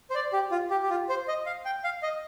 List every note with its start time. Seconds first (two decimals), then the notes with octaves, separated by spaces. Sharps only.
0.10 C5
0.15 D5
0.33 G4
0.51 F4
0.70 G4
0.83 G4
0.90 F4
1.09 C5
1.28 D#5
1.46 F5
1.65 G5
1.84 F5
2.03 D#5